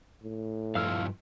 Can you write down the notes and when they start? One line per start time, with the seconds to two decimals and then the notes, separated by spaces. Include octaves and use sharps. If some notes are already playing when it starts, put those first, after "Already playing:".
0.23 A2
0.75 G2 F3 E4 F5 E6 F6